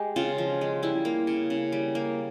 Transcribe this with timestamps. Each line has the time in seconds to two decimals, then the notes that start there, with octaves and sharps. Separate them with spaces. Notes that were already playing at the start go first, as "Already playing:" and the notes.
Already playing: G#3 G4
0.16 C#3 F4
0.38 F3
0.61 G#3
0.83 G3 E4
1.05 A#3
1.27 C#3
1.50 C#3
1.72 G3
1.95 A#3